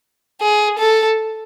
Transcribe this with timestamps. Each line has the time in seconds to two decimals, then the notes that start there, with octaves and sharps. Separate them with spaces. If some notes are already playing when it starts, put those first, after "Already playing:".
0.41 G#4
0.79 A4